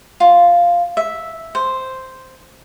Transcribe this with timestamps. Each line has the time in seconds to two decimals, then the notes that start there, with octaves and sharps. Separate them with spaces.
0.20 F4
0.97 E5
1.55 C5